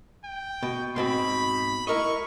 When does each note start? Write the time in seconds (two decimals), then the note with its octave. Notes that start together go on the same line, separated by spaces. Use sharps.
0.25 G5
0.63 B2
0.96 G#2 B2 C4 B5
1.87 E4 A#4 D#5 C#6